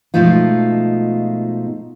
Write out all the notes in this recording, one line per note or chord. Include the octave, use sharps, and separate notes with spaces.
B2 F3 G#3 A3 D#4 F4